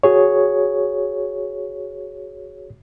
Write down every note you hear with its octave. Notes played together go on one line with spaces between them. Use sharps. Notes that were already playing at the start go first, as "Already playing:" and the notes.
F#4 G#4 C#5